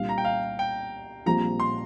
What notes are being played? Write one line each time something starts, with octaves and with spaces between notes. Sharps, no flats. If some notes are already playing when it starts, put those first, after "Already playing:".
Already playing: C2 A#2 G3 D4 F5
A#5
G5
F5
G5
A#1 A#2 G3 C4 A#5
C6